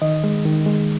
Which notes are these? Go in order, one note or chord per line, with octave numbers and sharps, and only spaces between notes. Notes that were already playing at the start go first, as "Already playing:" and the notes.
D#3 D#5
G#3
D#3
G#3